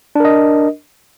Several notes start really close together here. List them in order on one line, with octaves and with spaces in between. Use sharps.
D4 A#4 D#5